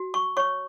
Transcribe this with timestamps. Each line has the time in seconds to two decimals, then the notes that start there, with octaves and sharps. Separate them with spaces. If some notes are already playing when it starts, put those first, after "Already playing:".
Already playing: F#4
0.14 C#6
0.37 C#5 C#6